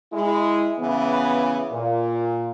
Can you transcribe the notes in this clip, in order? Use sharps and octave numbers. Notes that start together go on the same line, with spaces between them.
G#3 E4
C#3 E3 B3
A#2